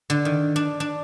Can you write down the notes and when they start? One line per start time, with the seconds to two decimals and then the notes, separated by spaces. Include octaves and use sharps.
0.10 D3
0.25 D#3
0.56 D4
0.80 D4